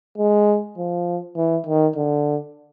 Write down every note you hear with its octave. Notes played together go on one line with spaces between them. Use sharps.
G#3
F3
E3
D#3
D3